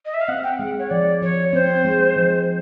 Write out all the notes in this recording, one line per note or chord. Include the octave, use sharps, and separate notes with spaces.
D#5
E5
F5
C4 F#5
G5
G#3 F#5
C#5
F3 D5
F3 C#5
C4 C5
G#3
F3